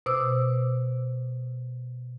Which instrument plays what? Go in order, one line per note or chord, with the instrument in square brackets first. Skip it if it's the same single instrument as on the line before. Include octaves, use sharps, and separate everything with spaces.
[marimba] B2 C5 D6 E6